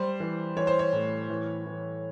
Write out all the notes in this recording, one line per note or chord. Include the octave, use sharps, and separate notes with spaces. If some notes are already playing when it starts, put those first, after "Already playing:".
Already playing: G3 C5
E3
E3 C#5
C5
C#5
A2
E3
E3